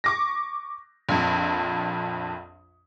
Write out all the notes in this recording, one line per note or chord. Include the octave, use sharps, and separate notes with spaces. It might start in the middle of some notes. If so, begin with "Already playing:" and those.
C#6 D6 A#6
A#1 F2